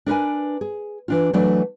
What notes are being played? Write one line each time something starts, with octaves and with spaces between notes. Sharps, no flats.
D4 A#4 B4 G#5
G#4
E3 D4 F4
E3 F#3 A3 D4 D5